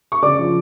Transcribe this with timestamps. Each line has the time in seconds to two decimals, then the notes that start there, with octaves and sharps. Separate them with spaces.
0.12 C#6
0.22 C#3 D5 D6
0.39 F3